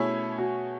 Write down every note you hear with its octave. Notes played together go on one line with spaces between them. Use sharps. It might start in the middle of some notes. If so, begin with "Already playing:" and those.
Already playing: B2 A3 C#4 E4 G#4 C#5
F#4